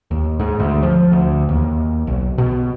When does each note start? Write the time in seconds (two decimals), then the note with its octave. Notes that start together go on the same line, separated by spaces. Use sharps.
0.11 D#2
0.40 G#2
0.60 D2
0.83 F3
1.12 D2
1.49 D#2
2.07 B1
2.38 B2